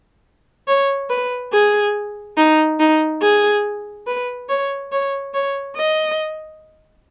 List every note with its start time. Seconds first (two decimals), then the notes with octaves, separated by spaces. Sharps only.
0.68 C#5
1.10 B4
1.53 G#4
2.37 D#4
2.80 D#4
3.22 G#4
4.07 B4
4.49 C#5
4.92 C#5
5.34 C#5
5.77 D#5